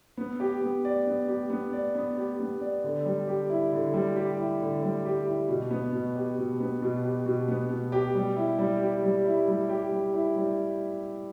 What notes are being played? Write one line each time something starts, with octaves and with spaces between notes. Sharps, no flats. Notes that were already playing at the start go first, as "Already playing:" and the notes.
B3
G4
B3
D5
B3
G4
B3
D5
B3
G4
B3
D5
D3
G3
G4
E4
D3
G3
G4
E4
D3
G3
G4
E4
B2
B3
B2
G4
B2
B3
B2
G4
B2
B3
B2
G4
G3
E4
G3
G4
G3
E4
G3
G4
G3
E4
G3